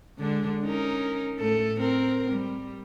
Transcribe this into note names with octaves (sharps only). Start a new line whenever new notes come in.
D3 G#3 D4
C#4 D#4 A#4
A2 A3 A4
C4 A#4
G3